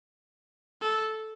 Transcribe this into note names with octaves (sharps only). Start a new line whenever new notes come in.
A4